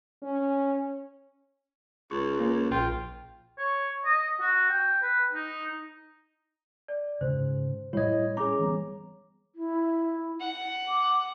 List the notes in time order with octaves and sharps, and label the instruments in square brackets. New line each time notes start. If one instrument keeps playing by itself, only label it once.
[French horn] C#4
[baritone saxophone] C#2 [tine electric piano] C#6
[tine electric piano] A#3 C#4
[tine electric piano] A#1 G5 [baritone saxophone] F4
[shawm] C#5
D#5
F#4
G5
B4
D#4
[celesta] D5
[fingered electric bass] G#2 C#3 [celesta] C5
[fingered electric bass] A2 G3 [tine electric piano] E4 D#5 [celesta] C#5 G#6
[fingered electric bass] C#4 [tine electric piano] G#4 A#5 [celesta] C#5 D6
[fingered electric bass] E3 G3 B3
[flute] E4
[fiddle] F#5
[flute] D6